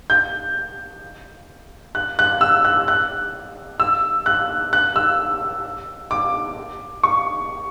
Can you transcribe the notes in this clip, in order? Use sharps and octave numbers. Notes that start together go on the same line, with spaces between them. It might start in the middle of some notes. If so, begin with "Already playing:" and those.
G6
F#6
F#6
E6
F#6
F#6
E6
F#6
F#6
E6
D6
C#6